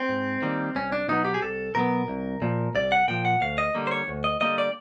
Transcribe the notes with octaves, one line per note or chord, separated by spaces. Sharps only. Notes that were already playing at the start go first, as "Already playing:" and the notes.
Already playing: C4
G#2
D#3 G3 A#3
C2 C#4
D4
B2 F#3 B3 D#4
G4
G#4
C2 A4
B2 F#3 B3 A#4
C2
A#2 F3
C2 D5
F#5
A#2 F3 G5
F#5
D2 F5
D#5
D3 G3 A#3
C5
C#5
D2
D#5
D3 G3 A#3 D#5
D5